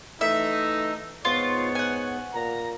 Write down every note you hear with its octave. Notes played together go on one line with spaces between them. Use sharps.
E3 A3 D#4 E5
G#2 B3 F4 C#5
F#5 G#5
A#2 A#5